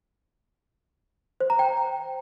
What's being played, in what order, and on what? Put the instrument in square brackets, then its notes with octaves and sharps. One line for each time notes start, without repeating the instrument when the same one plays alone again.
[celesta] C5
A#5
G5